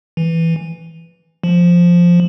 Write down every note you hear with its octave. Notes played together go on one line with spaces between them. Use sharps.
E3
F3